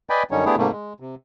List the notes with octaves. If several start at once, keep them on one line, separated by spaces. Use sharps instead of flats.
B4 D5 D#5 G5 G#5 B5
F#2 D3 G3 C#4 D#4 C#5
A3 B3 D4 E4 G4 G#4
G#2 C3 G3 A3 A#3
G#3
C3